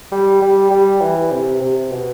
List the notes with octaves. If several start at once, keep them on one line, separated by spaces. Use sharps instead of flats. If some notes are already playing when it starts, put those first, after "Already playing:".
G3
G3
G3
E3
C3
C3
B2